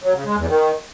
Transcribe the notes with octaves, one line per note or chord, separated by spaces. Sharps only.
F#3
C#3
G#3
E2
D#3